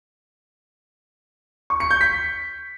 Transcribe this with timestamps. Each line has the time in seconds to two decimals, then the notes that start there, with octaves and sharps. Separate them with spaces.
1.70 C#6
1.80 C#7
1.91 G6
2.01 B6